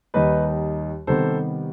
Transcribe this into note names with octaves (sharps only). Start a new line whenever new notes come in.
D#2 D#3 G3 D#4 B4 D#5
C3 D#3 G3 B3 A4 C5